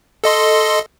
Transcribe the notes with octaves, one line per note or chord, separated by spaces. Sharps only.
A4 D#5 C6